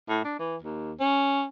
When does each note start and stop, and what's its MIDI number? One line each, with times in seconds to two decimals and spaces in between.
0.09 0.23 45
0.24 0.37 62
0.39 0.57 52
0.62 0.93 39
1.00 1.46 61